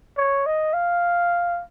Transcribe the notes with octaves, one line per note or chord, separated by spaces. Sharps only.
C#5
D#5
F5